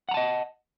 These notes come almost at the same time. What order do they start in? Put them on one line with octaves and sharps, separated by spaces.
F#5 A#5 A5 D#5